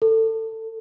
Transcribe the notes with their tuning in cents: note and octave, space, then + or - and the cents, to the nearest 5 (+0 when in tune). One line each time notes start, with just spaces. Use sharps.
A4 +20